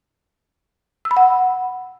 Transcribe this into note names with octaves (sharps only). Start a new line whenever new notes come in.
E6
B5
F#5